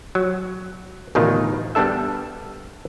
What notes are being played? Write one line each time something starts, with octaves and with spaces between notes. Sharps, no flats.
F#3
A1 D2 B2 D#3 D#4 F4
G3 B3 D4 A4 E5